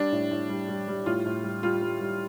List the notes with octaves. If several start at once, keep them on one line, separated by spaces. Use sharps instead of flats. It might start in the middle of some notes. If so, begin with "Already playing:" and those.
Already playing: G3 D4
A2
A2
G3
G3
G3
A2 F4
A2
G3
G3 F4
G3
G3